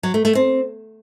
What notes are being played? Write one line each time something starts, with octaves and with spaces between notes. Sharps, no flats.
F#3
A3
A3
C4